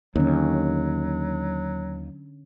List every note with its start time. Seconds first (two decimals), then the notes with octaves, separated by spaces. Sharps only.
0.16 D#2 D3 F#3 C#4